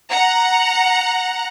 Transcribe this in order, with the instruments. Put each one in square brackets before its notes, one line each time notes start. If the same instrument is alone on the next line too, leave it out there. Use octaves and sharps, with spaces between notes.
[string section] F#5 A#5